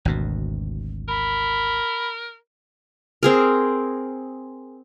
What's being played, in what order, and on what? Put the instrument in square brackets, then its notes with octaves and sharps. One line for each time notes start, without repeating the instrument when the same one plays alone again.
[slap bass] G#1 D2 B2
[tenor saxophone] A#4 [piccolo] B5
[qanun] C4 G#4 A#4